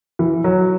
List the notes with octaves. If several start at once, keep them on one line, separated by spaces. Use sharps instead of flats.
E3
F#3